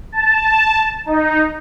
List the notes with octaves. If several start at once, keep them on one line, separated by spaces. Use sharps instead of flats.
A5
D#4